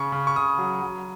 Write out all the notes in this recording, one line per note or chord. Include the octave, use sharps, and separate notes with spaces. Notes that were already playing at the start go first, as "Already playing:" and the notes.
Already playing: C#3 C#6
C#3
C#6
C#3 D#6
F#3
F#3